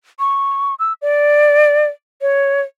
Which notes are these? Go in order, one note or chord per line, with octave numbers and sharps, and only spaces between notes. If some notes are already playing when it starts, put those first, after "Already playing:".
C#6
E6
D5
C#5